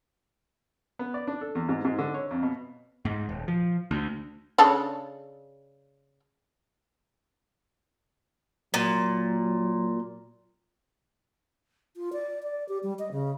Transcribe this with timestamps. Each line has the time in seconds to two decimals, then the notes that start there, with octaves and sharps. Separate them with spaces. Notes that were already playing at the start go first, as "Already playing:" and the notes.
0.99 B3
1.14 D5
1.27 D4
1.41 A4
1.55 E2
1.69 G#2
1.85 G#2
1.99 D3
2.14 C#5
2.31 F2
2.43 B2
3.05 G#2
3.29 D#1
3.48 F3
3.91 D2
4.58 C#3 D4 A4
8.74 A#2 F#3
11.97 F4
12.13 D5
12.43 D5
12.69 G4
12.83 G3
12.99 D#5
13.12 C#3